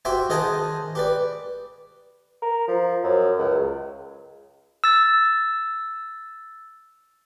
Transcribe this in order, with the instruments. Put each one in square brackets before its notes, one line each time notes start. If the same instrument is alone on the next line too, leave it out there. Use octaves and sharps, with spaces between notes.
[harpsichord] F#4 G4 C5 E5 G5
D#3 G#4 C5 D#5 F#5 A5
G4 B4 D5
[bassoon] A#4
F3
F#2
C#2
[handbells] E6 A6